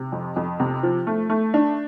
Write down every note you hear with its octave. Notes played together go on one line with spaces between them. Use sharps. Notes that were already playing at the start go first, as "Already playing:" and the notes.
Already playing: C3
F2
F2
C3
F3
A3
A3
D4